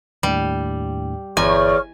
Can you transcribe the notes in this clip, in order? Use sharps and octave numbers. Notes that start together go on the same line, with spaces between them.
D#2 A2 G3 D4
G1 E2 C#5 G#5 C#6 F6